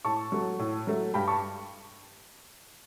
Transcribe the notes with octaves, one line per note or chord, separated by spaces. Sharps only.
A2 A5 C#6
F#3 A3
A2
F#3 A3
G2 G5 B5
A5 C#6